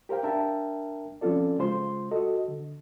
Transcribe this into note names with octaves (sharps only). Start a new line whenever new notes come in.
G4 A#4 C5 F5 G5
D4 A#4 E5 G5 A5
F3 C4 C#4 F4 A4 D5
C#3 G#3 F4 C5 C6
F#4 A4 D#5
D3